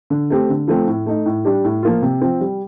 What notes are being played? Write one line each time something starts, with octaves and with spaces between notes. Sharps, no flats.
D3
A3 C4 G4
D3
F3 A3 C4
A2
A3 D#4
A2
G3 D4 G4
A2
F3 A#3 F4
C3
F3 C4
G3